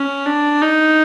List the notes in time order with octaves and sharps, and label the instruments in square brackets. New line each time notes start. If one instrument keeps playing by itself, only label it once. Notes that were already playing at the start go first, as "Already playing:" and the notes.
Already playing: [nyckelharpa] C#4
D4
D#4